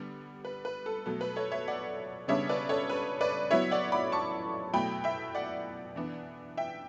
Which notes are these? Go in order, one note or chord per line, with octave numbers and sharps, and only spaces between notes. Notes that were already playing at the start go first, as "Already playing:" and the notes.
Already playing: D3 G3 B3
B4
B4
A4
B2 F#3 A3 A4
B4
A4 C#5
C#5 E5
D5 F#5
C#3 G3 B3 D4 C#5 E5
B4 D5
A4 C#5
B4
B4 D5
F#3 B3 E4 C#5 E5
D5 F#5
B5 D6
A5 C#6
B2 F#3 A3 E4 G5 B5
E5 G5
D5 F#5
E3 B3 D4
E5 G5